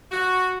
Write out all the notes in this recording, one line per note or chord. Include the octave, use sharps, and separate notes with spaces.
F#4